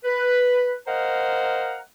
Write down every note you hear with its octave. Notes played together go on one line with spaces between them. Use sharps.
B4
A#4 C5 D#5 F5 F#5 A#5